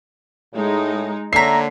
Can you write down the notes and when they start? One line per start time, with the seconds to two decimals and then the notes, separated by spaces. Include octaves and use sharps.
0.54 A2 G#3 D#4
1.33 D3 A#3 C#5 E5 A#5 B6 C7